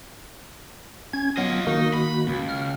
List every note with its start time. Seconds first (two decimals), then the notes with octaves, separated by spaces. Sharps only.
1.13 C#4 G#6
1.37 F#3 B3 F4 D#5
1.67 D#3 A#3 D#4 F#4
1.94 B5
2.28 C#2
2.49 F6